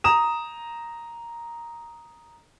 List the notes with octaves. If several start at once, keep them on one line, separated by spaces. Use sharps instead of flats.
A#5 D#6 E7